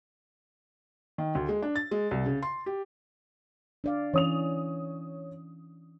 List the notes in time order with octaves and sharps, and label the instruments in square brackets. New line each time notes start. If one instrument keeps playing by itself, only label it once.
[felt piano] D#3
D2
G#3
D4
A6
G#3
C2
C#3
C6
G4
[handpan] D4 D5 F5
[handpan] E3 C#4 [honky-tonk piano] C#5 D#6 F7